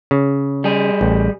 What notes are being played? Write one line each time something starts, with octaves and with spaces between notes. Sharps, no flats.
C#3
G3 G#4
A1